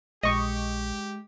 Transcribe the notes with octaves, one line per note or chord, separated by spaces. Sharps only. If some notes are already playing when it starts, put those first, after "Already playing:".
A#1 G#3 G4 D#5 C#6